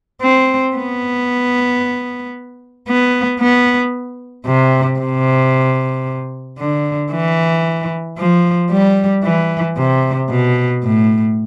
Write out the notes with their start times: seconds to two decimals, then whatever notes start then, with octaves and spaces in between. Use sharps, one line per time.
0.22 C4
0.76 B3
2.88 B3
3.40 B3
4.47 C3
4.99 C3
6.59 D3
7.12 E3
8.18 F3
8.71 G3
9.24 E3
9.77 C3
10.30 B2
10.84 A2